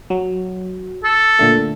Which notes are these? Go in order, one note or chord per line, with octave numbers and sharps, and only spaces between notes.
F#3
A4
A#2 D3 A3